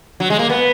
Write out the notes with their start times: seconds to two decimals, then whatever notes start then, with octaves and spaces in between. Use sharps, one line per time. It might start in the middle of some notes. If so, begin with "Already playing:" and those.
0.20 F#3
0.30 G#3
0.39 A#3
0.49 B3